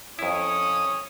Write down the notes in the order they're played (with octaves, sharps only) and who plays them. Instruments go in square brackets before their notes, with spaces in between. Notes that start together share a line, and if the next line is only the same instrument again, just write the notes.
[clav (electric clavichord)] F2 E4 [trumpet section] C#4 C#5 D#6